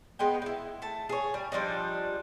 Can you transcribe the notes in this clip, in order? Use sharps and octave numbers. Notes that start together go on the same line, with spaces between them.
G#3 B3 D#4 G5
D#4 E4
A3 A5
G#4 C#5
G3
F3 G3 D4 D#4